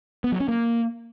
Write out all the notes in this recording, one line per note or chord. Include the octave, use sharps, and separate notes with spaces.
B3
F#3
C#4
A#3